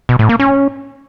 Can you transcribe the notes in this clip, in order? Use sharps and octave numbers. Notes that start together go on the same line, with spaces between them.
B2
A2
A#3
C#4